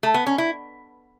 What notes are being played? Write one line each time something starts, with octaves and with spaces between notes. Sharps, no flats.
A3
B3
C#4
E4